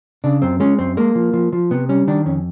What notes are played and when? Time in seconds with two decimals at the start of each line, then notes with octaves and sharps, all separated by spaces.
0.24 C#3 D4
0.42 F#2 C4
0.60 G#3 C#4
0.79 F#2 C4
0.97 G#3 A#3
1.15 F3
1.33 F3
1.53 F3
1.71 C3 B3
1.89 G3 C#4
2.07 D#3 D4
2.26 F2 C#4